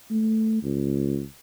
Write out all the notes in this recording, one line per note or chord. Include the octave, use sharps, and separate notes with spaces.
A3
C#2